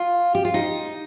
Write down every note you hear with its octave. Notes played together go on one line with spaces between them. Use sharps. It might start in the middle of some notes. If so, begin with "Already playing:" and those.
Already playing: F4
G4
F4
D#4